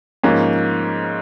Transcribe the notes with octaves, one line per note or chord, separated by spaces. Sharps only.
G#2 F3 A#3 C#4